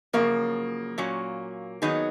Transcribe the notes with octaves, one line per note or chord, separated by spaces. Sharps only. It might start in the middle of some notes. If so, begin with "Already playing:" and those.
F#2 C#3 F3 A#3
A#2 F#3 C#4
D#3 F#3 B3 D#4 G#4